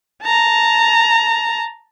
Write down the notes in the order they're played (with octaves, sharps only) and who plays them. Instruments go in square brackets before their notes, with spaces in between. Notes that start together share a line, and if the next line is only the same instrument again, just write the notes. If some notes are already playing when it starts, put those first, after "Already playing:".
[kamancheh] A5 A#5